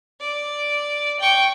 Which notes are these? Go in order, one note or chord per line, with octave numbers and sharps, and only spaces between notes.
D5
G5 C#6